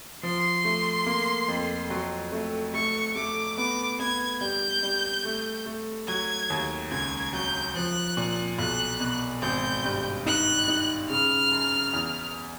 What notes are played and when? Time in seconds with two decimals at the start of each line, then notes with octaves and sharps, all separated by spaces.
0.23 F3 C6
0.65 A3
1.06 A#3
1.49 F2
1.90 F#3
2.32 A3
2.74 A3 C#6
3.15 A3 D6
3.57 B3 D6
3.99 B3 G#6
4.41 G3 G6
4.83 G3
5.25 A3
5.66 A3
6.07 F#3 G#6
6.50 D#2
6.91 C#2 G#6
7.33 F#3 G6
7.75 F3 F#6
8.17 A#2
8.58 B1 F#6
9.00 B2
9.42 G#1 G6
9.84 G2
10.26 D#4 F#6
10.68 D#4
11.09 C#3 F6
11.52 F#2
11.93 E2